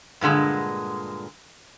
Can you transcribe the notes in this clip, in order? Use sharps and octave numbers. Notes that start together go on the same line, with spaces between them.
G2 A#2 D3 G#3